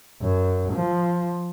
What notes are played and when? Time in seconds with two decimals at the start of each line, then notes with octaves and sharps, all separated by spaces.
0.22 F#2
0.73 F3